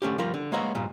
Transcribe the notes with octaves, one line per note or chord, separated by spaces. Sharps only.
D3 A3 C#4 G4
F3 G3 F4 G4 A#4
D3
G#3 A#3 B3 C#5 D#5 E5
G2 A#2 G3